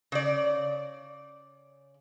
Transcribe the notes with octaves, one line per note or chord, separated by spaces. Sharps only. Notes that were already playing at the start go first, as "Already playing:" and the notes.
C#3 D5